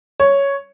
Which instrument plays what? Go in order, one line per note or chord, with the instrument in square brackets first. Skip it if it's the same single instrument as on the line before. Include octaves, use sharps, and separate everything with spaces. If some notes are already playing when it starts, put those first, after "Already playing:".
[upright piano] C#5